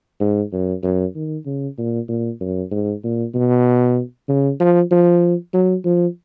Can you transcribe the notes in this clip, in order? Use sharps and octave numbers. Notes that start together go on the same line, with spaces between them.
G#2
F#2
F#2
D#3
C#3
A#2
A#2
F#2
G#2
A#2
B2
C#3
F3
F3
F#3
F3